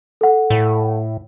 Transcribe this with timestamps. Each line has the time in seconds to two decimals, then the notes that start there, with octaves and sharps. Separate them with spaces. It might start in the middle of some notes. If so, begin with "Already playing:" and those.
0.21 A4 F#5
0.50 A2